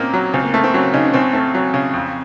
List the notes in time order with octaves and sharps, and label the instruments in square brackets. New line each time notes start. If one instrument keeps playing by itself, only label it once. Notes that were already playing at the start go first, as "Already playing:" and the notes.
Already playing: [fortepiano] A#2 A#3 D#4 [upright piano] C4 C#4
[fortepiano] F#3
[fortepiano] C#2 [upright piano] C4
[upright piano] A#3
[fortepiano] A3 [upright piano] C4
[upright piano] C4
[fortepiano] F#3 [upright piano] C#4
[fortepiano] C#3 [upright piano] D#4
[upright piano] C#4
[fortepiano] C#2 [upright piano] C4
[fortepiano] A3 [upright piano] C4
[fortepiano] F#3
C#3
F2